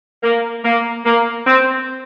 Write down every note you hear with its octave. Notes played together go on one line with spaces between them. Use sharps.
A#3
A#3
A#3
C4